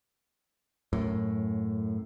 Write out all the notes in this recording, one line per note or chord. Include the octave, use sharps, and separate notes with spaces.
F#2 A2